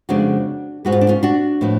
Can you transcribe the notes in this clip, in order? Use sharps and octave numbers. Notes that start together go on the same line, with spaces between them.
F2 C#3 G#3 B3 D4 F#4
G#2 G#3 B3 F#4
F4
D4
C#4 F4
D4 F#4
A2 F3 B3